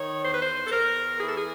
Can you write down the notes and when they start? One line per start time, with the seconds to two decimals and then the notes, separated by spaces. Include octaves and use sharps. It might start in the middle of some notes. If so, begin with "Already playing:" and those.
Already playing: D#3 C#5
0.24 E2 C5
0.33 B4
0.41 C5
0.66 A4
0.71 E2 A#4
1.19 E3 G#4
1.29 A4
1.38 G#4